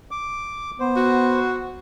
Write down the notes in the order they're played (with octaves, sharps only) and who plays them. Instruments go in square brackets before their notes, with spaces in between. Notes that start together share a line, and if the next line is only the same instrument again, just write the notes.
[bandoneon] D6
[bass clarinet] B3 [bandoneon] C5
[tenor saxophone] F#4